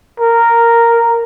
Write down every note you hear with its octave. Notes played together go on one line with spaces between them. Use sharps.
A#4